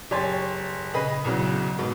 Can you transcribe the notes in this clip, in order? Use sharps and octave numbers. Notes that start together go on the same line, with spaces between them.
F#1 G4 C#5 G#5 C6 A6
C#3 G#4 B4 D#5 B5
B1 E2 C#3 F#3
G#2 B2